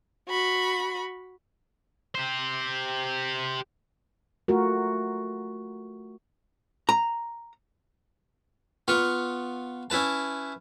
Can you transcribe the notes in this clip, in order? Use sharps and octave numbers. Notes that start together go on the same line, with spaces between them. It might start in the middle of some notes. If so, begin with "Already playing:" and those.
F#4 B5
G4 C5
A3 F4 F#4 A#4
A#5
B3 F4 C#6
C#4 E4 B4 A5